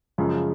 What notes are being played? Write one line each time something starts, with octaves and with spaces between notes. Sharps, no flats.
F#2 C#3 F3 G#3